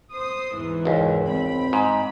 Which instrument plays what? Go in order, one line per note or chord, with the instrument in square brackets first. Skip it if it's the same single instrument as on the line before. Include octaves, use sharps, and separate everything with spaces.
[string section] C5 D#6
E2 G#2 E3
[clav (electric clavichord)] G#1 C#2
[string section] C4 B5
[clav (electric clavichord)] G#2